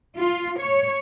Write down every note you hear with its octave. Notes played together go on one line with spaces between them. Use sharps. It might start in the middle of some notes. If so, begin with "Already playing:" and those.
F4
C#5